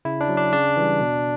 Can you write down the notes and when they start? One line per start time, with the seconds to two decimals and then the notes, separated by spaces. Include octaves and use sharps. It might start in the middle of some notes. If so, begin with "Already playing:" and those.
0.05 C#3 E4
0.21 D4
0.29 F#3
0.37 D4
0.53 C#3 D4
0.77 E3 G3
1.01 B2